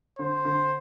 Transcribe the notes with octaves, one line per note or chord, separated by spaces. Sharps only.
D3 C5
D3